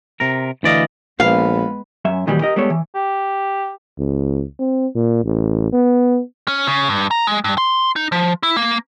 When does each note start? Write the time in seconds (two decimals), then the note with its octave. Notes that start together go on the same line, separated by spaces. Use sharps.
0.20 C3 A#4
0.63 D2 E3 D5 D#5 F5
1.20 A#1 G#3 B3 B4 F5
2.05 F#2 C#4 E5
2.27 A#2 D#3 E3 F#3 G3
2.41 G4 A#4 D#5
2.56 G3 G#3 B3 A4 C#5
2.70 E3
2.95 G4
3.99 C#2
4.60 C4
4.95 A#2
5.25 A1
5.73 B3
6.48 C#4
6.67 C#3
6.89 G2
7.11 A#5
7.27 G#3
7.44 G2
7.58 C6
7.96 D#4
8.12 F3
8.43 E4
8.57 A#3